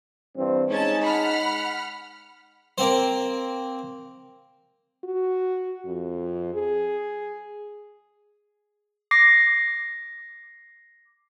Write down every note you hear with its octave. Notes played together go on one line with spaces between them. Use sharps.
G2 E3 C4
G#3 C#4 D#4 A5
F#5 B5 F6
A#3 C4 C5
F#4
F2
G#4
D6 A#6 C7